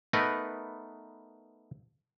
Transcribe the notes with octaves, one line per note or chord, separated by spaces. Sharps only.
A3 B3 D#4 A#4 B4